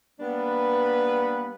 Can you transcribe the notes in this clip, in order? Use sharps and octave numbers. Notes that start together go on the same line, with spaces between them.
G3 A#3 B3 D4 B4